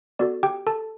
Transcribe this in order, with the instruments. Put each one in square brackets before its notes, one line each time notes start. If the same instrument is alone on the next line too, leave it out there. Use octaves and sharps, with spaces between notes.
[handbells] B3 F#4 A4 D5
G4 G5
A4 A5